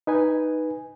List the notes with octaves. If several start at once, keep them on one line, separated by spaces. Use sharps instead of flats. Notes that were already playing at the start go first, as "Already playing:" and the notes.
D#4 B4 G#5